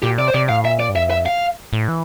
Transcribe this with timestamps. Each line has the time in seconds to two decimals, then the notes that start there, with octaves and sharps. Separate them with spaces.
0.03 A#2 G4
0.19 C3 D5
0.28 C5
0.33 C3 D5
0.49 A2 F5
0.65 A#2 E5
0.80 D5
0.89 G2
0.95 F2 E5
1.11 E5
1.26 F5
1.73 A2
1.88 E3